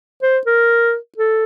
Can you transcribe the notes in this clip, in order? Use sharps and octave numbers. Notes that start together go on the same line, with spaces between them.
C5
A#4
A4